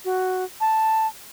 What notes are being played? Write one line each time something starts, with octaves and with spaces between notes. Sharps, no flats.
F#4
A5